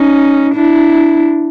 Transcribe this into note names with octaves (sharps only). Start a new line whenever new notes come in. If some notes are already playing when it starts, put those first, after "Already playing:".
Already playing: C#4 D#4
D4 E4